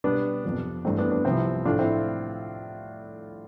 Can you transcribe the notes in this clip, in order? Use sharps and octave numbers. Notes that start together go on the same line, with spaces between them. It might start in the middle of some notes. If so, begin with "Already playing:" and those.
B2 G3 B3 D4
F2 C3 F3 B3
G2 E3 A3 C4
B3 D4
B3 D4
C2 C3 F3 C4 E4
A2 F3 A3 D4 F4
C4 E4